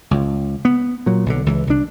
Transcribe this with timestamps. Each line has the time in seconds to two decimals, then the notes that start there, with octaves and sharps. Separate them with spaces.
0.11 C#2
0.65 B3
1.06 A#2 F#3
1.26 B1 D3
1.46 C#2 E3
1.67 C2 D4